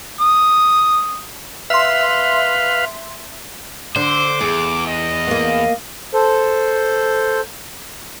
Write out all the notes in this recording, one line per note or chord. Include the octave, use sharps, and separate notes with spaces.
D#6
B4 E5 F5 C6
D3 C5 D6
E2 G#4
D#5
A#3 B3
A4 C5